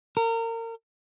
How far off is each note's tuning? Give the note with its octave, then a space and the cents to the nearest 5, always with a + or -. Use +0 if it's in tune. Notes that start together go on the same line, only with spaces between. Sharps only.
A#4 -30